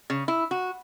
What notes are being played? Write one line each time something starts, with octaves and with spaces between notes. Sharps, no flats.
C#3
E4
F#4